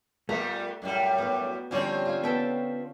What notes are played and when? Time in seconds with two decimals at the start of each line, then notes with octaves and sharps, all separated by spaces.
0.29 A#2 G3 A3 B3 A#5
0.82 F#2 A2 G3
1.18 B3 F#4
1.71 D3 F3 G3 C4 C#4 C#5
2.05 F4 G#5
2.24 B3 A4 G5 A5